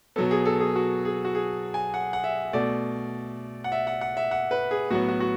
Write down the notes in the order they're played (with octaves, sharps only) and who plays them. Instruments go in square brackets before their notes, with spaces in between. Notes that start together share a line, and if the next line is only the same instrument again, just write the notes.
[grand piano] B3 A4
B2 F#3
G#4
A4
G#4
F#4
G#4
F#4
G#4
G#5
F#5
F#5
E5
B2 A3 D5
F#5
E5
F#5
F#5
E5
F#5
B4
G#4
A2 F#3 B3 F#4
F#4
F#4